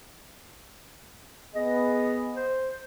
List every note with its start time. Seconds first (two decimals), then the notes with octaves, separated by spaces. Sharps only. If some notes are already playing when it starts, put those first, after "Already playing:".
1.55 B3 G#4 D#5
2.36 C5